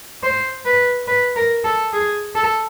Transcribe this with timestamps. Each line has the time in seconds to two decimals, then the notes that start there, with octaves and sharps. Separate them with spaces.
0.23 C5
0.65 B4
1.08 B4
1.36 A#4
1.64 A4
1.93 G#4
2.35 A4